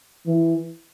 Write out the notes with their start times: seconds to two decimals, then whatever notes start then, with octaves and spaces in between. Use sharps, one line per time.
0.26 E3